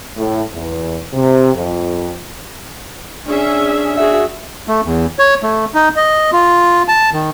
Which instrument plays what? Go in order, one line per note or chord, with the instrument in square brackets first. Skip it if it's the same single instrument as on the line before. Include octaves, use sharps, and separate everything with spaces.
[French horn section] A2
E2
C3
F2
[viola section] C#4 G#4 E5 [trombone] D4
[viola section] F#4 [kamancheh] G#4 E5
[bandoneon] A3
E2
C#5
A3
D#4
D#5
F4
A5
D#3